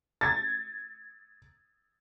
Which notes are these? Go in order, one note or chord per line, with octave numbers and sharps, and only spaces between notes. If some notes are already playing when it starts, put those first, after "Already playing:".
G#6 A6